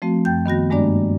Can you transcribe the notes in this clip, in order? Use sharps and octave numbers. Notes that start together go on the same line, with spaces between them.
F3 A3 C4 F#4
F#2 G5 G6
D#3 B3 F#4 A#6
G2 G#3 A#3 D4 D5